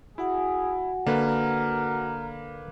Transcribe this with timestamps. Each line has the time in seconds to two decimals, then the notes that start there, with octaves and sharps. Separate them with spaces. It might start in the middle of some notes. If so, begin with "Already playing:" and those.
0.18 E4 F#4 G#4 F#5 G#5
1.07 D3 A#3 A#4 B4